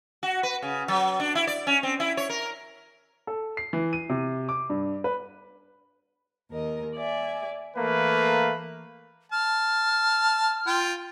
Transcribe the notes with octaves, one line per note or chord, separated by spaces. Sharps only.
F#4
B4
C#3
F#3
D4
E4
D5
C#4
C4
E4
C#5
A#4
A4
C7
E3
D#7
C3
D6
G2
B4
D#2 A#4 D#5
D5 E5 G#5
E3 A3 A#3 B4
A5 F6
F4 G5